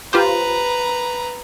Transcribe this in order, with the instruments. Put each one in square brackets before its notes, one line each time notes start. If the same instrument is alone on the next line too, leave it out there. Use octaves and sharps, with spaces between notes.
[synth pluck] F4 G4 C5 [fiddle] B4 A#5